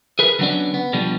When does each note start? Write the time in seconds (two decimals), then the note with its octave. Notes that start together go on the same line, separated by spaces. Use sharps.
0.19 G#4 A#4 B4
0.39 D3 F#3 B3 C#4 D4
0.74 B3
0.93 B2 D3 F3 G3